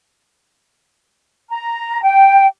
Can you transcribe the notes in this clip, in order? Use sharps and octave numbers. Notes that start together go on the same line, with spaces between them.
A#5
G5